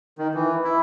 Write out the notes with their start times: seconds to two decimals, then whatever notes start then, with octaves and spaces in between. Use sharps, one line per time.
0.18 D#3
0.34 E3
0.64 E4